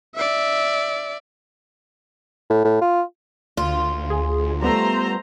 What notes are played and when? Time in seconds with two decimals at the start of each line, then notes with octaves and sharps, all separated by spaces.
0.15 D5 E5
2.50 A2
2.64 A2
2.81 F4
3.57 D2 F4
4.10 G#4
4.62 G3 A3 B3 C5 A#5